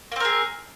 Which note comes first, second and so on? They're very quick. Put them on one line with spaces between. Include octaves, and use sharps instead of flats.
A#3 C4 A#4 G#4